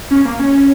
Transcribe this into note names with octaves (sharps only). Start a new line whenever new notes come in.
C#4
A#3
C#4